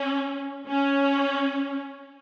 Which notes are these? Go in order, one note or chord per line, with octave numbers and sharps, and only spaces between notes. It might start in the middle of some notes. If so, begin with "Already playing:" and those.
Already playing: C#4
C#4